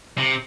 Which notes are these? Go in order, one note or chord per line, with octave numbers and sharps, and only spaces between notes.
C3